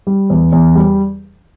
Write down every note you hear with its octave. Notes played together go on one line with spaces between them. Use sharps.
G3
E2
E2
G3